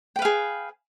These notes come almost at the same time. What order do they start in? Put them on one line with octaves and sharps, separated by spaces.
G5 B4 F5 G#4